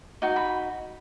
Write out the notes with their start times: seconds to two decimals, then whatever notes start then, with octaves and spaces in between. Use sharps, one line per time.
0.22 D#4 F#4
0.36 B5